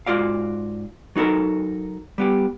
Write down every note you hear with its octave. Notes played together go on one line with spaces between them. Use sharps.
G#2 F4 F#4 D5 F5
F#3 D#4 F#4 A4 A#4
G3 B3 G4